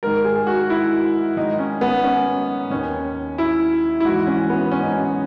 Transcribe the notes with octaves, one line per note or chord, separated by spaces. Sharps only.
G#2 D#3 A#4
G#4
F#4
E4
G#2 D#3 D#4
C#4
B3
C#4
D#2 D#3 C#4
E4
E4
G#2 E3 F#4
C#4
B3
C#4
D#4
C#4